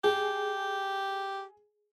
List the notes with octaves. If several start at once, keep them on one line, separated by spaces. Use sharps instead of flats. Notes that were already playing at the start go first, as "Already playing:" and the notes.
G4 G#4